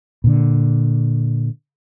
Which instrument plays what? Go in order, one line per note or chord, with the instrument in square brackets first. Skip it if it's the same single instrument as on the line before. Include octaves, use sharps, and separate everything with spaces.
[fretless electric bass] A#2 D3